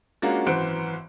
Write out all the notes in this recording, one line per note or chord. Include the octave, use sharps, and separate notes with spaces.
G#3 A#3 C#4 D4 F4 F#4
G#1 F#2 E3 C5 F#5 D7